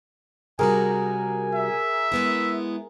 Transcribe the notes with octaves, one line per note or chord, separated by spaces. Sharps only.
C3 G3 F#4 G#4 A#4 G#5
E5
G#3 B3 E4